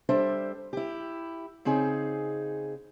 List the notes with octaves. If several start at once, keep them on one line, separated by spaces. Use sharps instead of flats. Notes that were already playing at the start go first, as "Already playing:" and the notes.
G3 D4 A4 C5 E5
E4 G4
C#3 C4 D#4 G#4